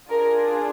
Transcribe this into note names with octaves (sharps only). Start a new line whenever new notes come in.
D4 F4 G#4 A#4